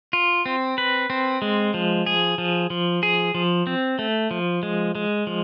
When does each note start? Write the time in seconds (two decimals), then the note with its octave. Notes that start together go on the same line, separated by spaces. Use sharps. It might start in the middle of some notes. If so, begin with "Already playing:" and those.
0.13 F4
0.46 C4
0.78 B4
1.10 C4
1.42 G#3
1.74 F3
2.06 G#4
2.38 F3
2.70 F3
3.03 G#4
3.35 F3
3.67 C4
3.99 A3
4.31 F3
4.63 G#3
4.95 G#3
5.27 F3